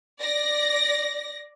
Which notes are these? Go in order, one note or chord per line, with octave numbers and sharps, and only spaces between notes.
D5 A#6